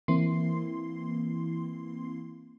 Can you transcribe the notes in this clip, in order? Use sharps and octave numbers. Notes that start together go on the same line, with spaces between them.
E3 A#3 C4 E4 C6 C7